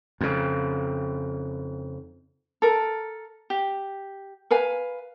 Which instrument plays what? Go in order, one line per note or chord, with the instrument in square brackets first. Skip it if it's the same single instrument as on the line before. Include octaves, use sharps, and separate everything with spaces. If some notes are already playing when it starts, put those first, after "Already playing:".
[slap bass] F2 C#3
[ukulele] A4 A#4
G4
A#4 B4 F5 G#5